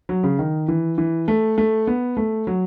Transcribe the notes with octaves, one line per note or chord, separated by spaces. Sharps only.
F#3
C#3
D#3
E3
E3
A3
A3
B3
A3
F#3